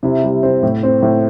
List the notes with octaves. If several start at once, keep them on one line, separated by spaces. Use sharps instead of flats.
C3 E4
G3
C4
A2
C4
A2